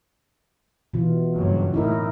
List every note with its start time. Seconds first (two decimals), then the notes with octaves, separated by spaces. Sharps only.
0.94 B2 E3 F4
1.34 F#1 G2 F#3
1.74 A2 A3 D#4 E4 A#4